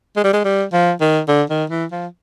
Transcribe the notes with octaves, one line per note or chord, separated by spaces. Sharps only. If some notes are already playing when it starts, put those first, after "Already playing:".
G#3
G3
G#3
G3
F3
D#3
D3
D#3
E3
F3